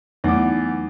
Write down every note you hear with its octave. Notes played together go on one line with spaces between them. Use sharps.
E2 F#3 A3 D#4 D6